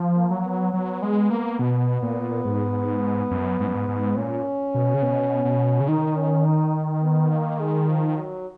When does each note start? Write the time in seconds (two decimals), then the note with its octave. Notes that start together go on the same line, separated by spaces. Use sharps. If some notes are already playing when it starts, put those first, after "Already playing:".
Already playing: F3
0.16 A#3
0.30 F#3
0.44 B3
0.74 F#3 B3
1.02 G#3
1.30 A#3
1.59 B2
2.02 A#2
2.45 G#2
3.31 F#2
3.60 G#2
3.67 F#2
3.75 G#2
3.88 G#2
4.16 A#2 C#4
4.74 B2
4.94 C#3
5.02 B2
5.45 B2
5.80 C#3
5.88 D#3 D#4
6.16 C#4
6.46 D#4
7.03 B3
7.31 A#3
7.60 G#3
7.88 F3
8.17 F#3